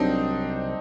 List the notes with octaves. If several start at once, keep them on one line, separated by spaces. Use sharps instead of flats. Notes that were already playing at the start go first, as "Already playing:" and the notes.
Already playing: C2 F#3 C4 D4 D#4